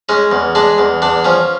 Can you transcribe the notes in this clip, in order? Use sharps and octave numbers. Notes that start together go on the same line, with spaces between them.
G#3 C#4
E2
G#3 D4
E2
E2 D4
F3 C#4